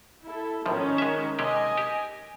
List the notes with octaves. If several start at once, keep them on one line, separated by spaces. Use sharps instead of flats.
E4 A4
G#1 A2 D#3 F3 C#4
G#3 E5
C3 G#3 G4 D#5 G#5
G4